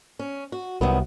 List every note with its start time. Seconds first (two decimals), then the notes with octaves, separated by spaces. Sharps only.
0.19 C#4
0.52 F#4
0.81 C2 D#3 F#3 B3